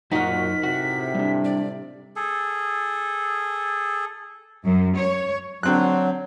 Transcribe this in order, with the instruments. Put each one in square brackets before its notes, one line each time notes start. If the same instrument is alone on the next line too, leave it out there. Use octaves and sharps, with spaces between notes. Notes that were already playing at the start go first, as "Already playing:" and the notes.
[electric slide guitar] F#2 C5 F#5 [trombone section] A#2 F#4 [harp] D#4 A#4 [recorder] B6
[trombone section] A2 C3 [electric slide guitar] F#4 F#5
[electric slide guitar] G3 D4
[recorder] D5
[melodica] G#4 A4
[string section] F#2
C#5
[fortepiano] D3 C4 F#6 [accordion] F#3